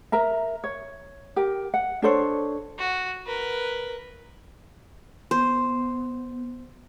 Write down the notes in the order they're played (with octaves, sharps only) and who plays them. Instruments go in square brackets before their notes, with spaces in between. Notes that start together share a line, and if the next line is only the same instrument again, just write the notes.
[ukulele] A#4 E5 A#5
C#5
G4 A#4
F#5
D4 A4 C5 C#5
[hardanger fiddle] F#4
A#4 B4
[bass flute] B3 [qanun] C5